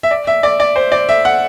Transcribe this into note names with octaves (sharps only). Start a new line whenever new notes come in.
E5
D5
E5
D5
D5
C5
D5
E5
F#5